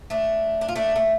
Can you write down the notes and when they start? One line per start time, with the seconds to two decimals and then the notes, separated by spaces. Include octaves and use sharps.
0.10 A3 D4
0.61 D4
0.68 F4
0.76 A3 D4
0.96 A3